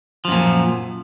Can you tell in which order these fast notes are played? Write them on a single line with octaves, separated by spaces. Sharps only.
F3 F#2 A#2